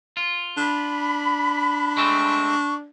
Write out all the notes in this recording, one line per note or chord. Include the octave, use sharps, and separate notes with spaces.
F4
D4 B5
G#3 A3 C4 C#6